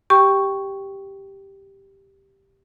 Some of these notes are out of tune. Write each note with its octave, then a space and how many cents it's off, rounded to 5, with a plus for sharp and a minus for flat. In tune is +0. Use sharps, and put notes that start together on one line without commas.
G4 +0 G5 +0 C#6 +0